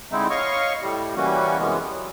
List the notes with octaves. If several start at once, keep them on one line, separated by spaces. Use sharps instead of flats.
D3 G#3 C4 D#4 E4
C#5 D#5 F5 C#6
A2 G3
E3 G3 A#3 C#4 F#4
F#2 C3 E3 G#3 B3
F#3